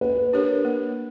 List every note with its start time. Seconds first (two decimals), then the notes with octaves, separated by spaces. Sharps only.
0.01 A#3 B4
0.33 D4 G4 A#4 C#5
0.65 A#3